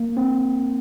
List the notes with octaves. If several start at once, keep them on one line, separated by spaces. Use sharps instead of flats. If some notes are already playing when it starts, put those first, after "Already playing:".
Already playing: A#3
C4